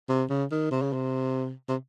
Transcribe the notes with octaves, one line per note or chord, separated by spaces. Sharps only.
C3
C#3
D#3
C3
C#3
C3
C3